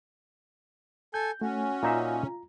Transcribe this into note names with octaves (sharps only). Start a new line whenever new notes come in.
A4 G#5 G6
A3 C#4 F#4
A#2 D#4 F4 E5 A#5